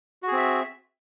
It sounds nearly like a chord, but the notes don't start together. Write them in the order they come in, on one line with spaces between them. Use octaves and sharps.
F#4 G#4 C4 E5